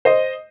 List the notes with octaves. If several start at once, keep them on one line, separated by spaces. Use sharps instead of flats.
C5 D#5